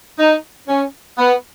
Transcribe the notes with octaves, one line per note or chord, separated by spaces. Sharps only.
D#4
C#4
B3